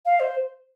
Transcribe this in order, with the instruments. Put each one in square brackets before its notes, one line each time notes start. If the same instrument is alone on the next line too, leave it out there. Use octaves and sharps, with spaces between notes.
[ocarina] F5
C5